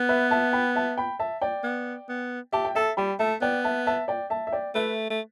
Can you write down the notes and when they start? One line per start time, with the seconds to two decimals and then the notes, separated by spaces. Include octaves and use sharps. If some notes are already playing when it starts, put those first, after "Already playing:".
Already playing: B3
0.09 B4 E5
0.31 E5 A5
0.53 G5 B5
0.76 E5 A5
0.98 G5 B5
1.19 E5 A5
1.42 D5 G5
1.64 B3
2.09 B3
2.53 G4 E5 A5
2.65 G5
2.75 A4 E5 A5
2.97 G3 G5 B5
3.19 A3 E5 A5
3.41 B3 D5 G5
3.64 E5 A5
3.87 E5 A5
4.08 D5 G5
4.30 E5 A5
4.47 E5
4.52 D5 G5
4.75 A3 B4 E5
5.10 A3